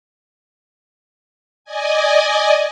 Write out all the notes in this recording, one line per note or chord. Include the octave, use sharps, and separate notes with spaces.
D5 D#5 G#5